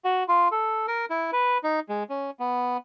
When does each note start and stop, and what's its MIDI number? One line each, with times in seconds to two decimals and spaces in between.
0.05 0.23 66
0.28 0.48 65
0.51 0.86 69
0.88 1.05 70
1.10 1.30 64
1.32 1.58 71
1.63 1.80 63
1.89 2.03 56
2.10 2.30 61
2.40 2.77 59